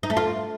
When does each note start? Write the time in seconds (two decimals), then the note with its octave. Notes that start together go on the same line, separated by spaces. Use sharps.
0.03 D#4
0.10 A3
0.17 F4